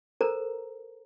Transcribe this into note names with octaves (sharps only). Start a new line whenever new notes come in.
A4 A#4 C5 A#5